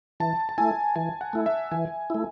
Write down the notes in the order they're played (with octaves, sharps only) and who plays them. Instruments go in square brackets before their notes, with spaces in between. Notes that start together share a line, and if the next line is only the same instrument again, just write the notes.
[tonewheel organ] E3 [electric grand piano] A5
[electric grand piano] A5
[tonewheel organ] A3 E4 [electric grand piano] G#5
[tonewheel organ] E3 [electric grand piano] G#5
[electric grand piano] F#5
[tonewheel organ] A3 E4
[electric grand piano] E5
[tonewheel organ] E3 [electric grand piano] G#5
[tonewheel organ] A3 E4